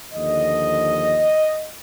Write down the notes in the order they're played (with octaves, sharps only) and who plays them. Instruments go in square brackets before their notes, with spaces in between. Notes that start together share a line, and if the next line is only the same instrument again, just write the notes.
[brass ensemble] D#2 D3 F3 D#5